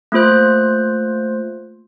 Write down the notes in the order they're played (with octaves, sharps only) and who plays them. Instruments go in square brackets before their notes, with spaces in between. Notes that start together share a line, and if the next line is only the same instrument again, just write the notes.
[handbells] A3 A#3 F4 C5 F#6